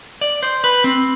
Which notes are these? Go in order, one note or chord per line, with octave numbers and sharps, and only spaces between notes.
D5
C5
B4
C4